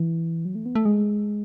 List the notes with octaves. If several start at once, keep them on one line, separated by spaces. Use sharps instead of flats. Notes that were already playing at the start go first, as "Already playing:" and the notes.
Already playing: E3
F#3
A3
B3
A3
G#3